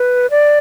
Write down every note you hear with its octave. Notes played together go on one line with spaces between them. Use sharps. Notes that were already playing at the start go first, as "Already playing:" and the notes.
Already playing: B4
D5